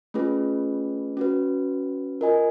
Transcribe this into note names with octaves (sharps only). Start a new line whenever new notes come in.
A3 C#4 F4 G#4 B4
C#4 F#4 B4
F4 A#4 D#5 G#5